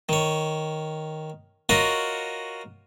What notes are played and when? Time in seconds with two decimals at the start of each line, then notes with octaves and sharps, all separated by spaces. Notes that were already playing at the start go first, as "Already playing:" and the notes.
0.09 D#3 C#5
1.69 F4 F#4 A#4 C#5 D#5 F#5